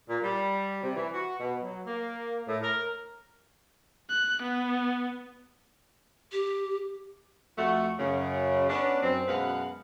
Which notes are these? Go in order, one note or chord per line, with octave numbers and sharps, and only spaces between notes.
A#2
G3
C3
E3
F#4
B2
F#3
A#3
A2
A#4
F#6
B3
G4
F2 A3 F#4
F#2 C#3
B3 C#4 D4
F#2 C4
F#2 B2 G#3 B4 F5 F#5